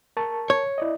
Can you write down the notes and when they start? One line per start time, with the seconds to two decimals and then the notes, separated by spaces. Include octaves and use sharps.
0.17 A#4 A5 C#6
0.50 C#5
0.78 E4 D5 D#5